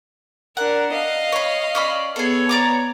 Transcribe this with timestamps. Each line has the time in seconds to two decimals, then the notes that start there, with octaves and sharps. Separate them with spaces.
0.57 D4 A#4 F#5
0.93 D#5 F5
1.32 C#5 B5
1.75 C#4 D5 B5
2.16 B3 G#4 A4 C#5
2.49 D5 A#5 D6